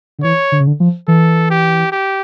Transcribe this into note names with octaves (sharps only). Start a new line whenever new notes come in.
D3
E3 C#5
D3
C#3
D3
F3
E3 A4
G4
G4